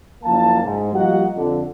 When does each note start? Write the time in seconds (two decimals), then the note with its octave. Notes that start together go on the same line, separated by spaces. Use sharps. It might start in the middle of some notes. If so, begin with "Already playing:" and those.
0.23 F#1 F3 A#3 A5
0.62 G#2
0.93 F3 G3 A#3 F#4 D#5 F#5
1.35 F2 D3